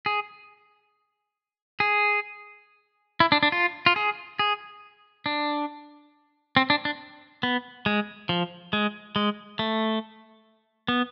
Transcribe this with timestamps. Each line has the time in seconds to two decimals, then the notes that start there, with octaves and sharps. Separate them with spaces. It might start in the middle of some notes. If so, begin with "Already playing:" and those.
0.06 G#4
1.80 G#4
3.20 E4
3.32 D4
3.43 D4
3.52 F4
3.86 F4
3.96 G#4
4.39 G#4
5.26 D4
6.57 C4
6.70 D4
6.85 D4
7.43 B3
7.86 G#3
8.29 F3
8.73 G#3
9.16 G#3
9.59 A3
10.88 B3